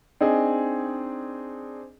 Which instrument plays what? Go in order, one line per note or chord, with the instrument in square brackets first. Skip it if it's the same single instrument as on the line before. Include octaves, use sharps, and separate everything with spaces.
[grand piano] C4 D4 D#4 G#4